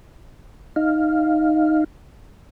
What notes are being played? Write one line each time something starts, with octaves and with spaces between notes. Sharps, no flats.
D#4 F5